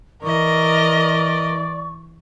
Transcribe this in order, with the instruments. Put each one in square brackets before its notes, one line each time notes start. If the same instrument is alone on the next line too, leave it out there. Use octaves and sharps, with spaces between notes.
[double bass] E3 [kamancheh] A#4 D#5 [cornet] D5 [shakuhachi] C#6